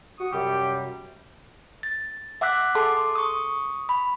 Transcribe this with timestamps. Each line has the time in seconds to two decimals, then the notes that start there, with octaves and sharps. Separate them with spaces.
0.19 F#4 C#6 D#6
0.32 F#2 C3 G3 G4
1.83 A6
2.41 E5 F#5 D6 E6 F#6 B6
2.75 G#4 A4 A5 C6 D6
3.15 C#6 D#6
3.89 B5